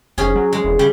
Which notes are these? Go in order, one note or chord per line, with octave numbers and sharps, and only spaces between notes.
F1 C#4 G#4
F#3
G#3
E1
C#3 G3